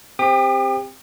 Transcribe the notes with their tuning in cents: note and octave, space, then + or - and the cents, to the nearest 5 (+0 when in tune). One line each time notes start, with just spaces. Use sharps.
C4 +0 G4 +25 D#6 -45